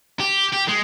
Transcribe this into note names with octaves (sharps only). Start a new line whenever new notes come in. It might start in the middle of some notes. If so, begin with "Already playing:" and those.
G4
G4
G#3